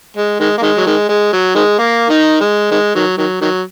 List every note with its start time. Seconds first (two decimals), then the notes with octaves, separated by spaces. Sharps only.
0.17 G#3
0.40 D#3 G#3
0.58 A#3
0.62 D#3 G#3
0.77 F#3
0.86 D#3 G#3
1.09 G#3
1.33 F#3
1.55 D#3 G#3
1.79 A#3
2.09 D#3 D#4
2.41 G#3
2.71 D#3 G#3
2.95 D#3 F#3
3.18 D#3 F#3
3.41 D#3 F#3